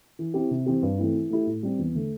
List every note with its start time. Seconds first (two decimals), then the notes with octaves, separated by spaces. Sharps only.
0.19 E3
0.34 C4 E4 G4
0.51 C3
0.66 E3 C4 G4
0.83 G2
0.98 E3 A3 C4 E4
1.14 E3
1.30 A3 E4 G4
1.47 A2
1.63 G3 C4
1.79 E2
1.95 D3 A3